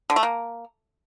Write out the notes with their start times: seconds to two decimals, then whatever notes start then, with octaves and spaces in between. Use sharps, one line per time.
0.10 D3
0.16 A3
0.23 A#3